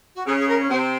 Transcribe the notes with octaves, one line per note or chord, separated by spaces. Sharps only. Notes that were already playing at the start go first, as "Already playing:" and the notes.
F#4
C#3 C#4 G#4
G#4
A#4
C#4
C3 C4 C5